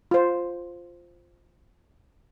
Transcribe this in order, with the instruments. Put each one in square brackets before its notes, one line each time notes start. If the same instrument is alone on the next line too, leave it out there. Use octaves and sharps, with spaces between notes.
[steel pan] F4 C5